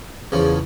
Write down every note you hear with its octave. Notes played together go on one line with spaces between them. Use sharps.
E2 C#3 F3